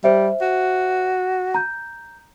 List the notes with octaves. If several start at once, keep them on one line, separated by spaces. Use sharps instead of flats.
G3 C5 E5
F#4
A#5 G6